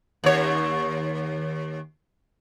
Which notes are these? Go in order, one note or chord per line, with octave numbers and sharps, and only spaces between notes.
D#2 C#5